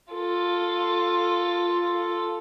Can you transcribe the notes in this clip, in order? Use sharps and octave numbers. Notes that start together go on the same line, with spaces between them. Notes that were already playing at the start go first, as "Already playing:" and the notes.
F4 A4